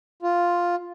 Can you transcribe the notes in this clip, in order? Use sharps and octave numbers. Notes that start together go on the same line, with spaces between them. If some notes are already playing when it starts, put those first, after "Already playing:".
F4